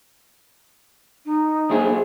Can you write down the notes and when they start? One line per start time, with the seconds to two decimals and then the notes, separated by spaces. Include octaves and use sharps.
1.25 D#4
1.70 B1 A#2 G#4